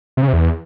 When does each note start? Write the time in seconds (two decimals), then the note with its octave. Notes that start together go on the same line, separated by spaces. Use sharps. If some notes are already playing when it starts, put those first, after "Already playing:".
0.17 C3
0.22 C#3
0.28 C3
0.33 E2